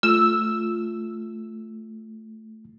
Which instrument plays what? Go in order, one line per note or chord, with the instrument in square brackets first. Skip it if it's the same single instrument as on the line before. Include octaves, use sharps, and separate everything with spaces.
[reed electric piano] A3 [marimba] F4 [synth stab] E6